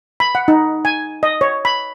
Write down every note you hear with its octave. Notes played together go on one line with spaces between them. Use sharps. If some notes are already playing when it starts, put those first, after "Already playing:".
B5
F#5
D#4
G#5
D#5
C#5
B5